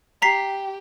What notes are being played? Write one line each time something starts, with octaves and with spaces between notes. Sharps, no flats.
G4 A#5 B6 C7